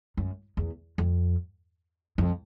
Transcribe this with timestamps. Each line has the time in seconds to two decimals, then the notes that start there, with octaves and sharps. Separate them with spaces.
0.17 F#2
0.57 E2
0.98 F2
2.18 F2